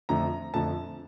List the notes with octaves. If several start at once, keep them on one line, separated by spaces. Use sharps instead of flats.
F2 D3 F3 A3 A#5
F2 D3 F3 A3 A5